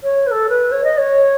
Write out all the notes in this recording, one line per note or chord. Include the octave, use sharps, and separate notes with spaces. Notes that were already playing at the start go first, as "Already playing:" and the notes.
C#5
B4
A4
B4
C#5
D#5
C#5